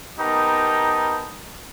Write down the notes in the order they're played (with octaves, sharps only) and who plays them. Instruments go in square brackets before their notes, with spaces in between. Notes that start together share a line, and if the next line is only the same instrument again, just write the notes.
[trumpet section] B3 D#4 G4 A#4 A5 A#5